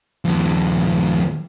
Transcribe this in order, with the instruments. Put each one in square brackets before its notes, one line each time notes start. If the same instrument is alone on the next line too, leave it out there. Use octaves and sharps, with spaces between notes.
[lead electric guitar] D#2 F3